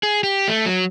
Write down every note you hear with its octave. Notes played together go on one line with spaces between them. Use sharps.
G#4
G4
A3
F#3